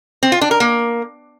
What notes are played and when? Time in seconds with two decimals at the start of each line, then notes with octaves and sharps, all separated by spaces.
0.23 C4
0.32 F4
0.41 D4
0.51 A#4
0.60 A#3